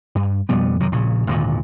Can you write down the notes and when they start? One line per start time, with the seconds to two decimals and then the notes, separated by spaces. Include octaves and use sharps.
0.15 G2
0.49 F2 B2 G3 B3
0.80 F#2 C3 D#3
0.92 A#1 A#2 C#3
1.27 G#1 D#2 A#2 D3